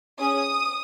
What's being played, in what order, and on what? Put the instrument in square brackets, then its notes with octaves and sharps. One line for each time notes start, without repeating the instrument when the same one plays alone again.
[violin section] C#4 G#4 D#6